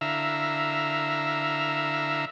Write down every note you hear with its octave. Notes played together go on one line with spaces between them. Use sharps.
D3 E4 E5 F5 A#5